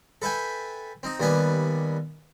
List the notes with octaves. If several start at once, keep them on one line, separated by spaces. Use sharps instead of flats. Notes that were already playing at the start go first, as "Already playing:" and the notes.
A4 B4 E5 G5 G#5
C4 D#4
D#2 G3 B3 B4 G#5